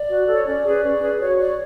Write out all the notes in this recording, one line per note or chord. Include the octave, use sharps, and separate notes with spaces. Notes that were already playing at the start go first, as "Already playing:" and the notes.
Already playing: D5
F#4
A4 C#5
C#4 D5
G#4 B4
C#4
G#4 B4
F#4 C#5
C#5 D5